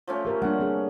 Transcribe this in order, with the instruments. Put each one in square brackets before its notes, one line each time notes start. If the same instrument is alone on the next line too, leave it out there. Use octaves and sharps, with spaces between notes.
[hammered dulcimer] F3 A3 C#4
[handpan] G4 A#4
[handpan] G3 A#3 D4 [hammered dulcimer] F#5
[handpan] C4 D4 G#4